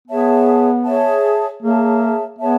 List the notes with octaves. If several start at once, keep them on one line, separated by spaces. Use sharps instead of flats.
B3 G#4 C#5 E5 A5
G#4 C#5 E5 A5
A#3 G#4 C#5 E5 A5
B3 G#4 C#5 E5 A5